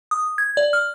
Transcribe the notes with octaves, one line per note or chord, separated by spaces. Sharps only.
D#6
G#6
D5
F6